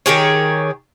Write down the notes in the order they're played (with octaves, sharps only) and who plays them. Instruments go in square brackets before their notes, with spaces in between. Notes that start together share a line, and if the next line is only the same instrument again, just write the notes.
[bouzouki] D#3 G4 G#4 C#5